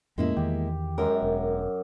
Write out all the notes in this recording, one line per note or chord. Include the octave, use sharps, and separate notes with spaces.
F2 A2 G#3 A#3 C#4 E4
E2 D#3 G4
F#2 G#3 A#4
E1